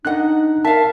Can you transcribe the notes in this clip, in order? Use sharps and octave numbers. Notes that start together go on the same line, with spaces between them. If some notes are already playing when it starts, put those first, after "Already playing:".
D4 D#4 D#5 F#5 F#6
A#4 E5 F5 A5